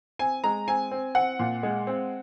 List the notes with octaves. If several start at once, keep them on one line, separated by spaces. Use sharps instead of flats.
C4 G#5
G#3 A#5
C4 G#5
C4
C4 F#5
A#2
G#3
C4